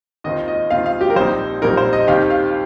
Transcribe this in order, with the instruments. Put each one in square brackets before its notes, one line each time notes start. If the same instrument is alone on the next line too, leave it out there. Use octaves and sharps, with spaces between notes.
[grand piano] D#2 D#3 C4 F4 [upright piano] D#5
[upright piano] D#5
[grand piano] D#2 D#3 C4 F4 [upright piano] F5
[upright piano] F5
G4
A#4
[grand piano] A#1 A#2 G3 C4 D#4 [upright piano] C5
[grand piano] A#1 A#2 G3 C4 D#4 [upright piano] A#4
[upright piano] C5
D#5
[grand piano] D#2 D#3 C4 G4 [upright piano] F5
[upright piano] F5